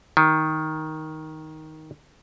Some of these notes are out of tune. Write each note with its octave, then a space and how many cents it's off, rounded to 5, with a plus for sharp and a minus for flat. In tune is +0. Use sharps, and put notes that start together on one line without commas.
D#3 +10